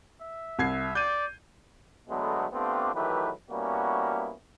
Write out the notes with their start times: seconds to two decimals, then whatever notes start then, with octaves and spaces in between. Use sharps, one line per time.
0.21 E5
0.59 C2 G#6 C7
0.95 D5 G6 D#7
2.09 D3 F#3 G#3 A3 B3
2.52 A3 B3 C4 D4 F4 G4
2.94 D#3 E3 F#3 A3 G4 B4
3.49 G3 A#3 B3 C#4 E4 F#4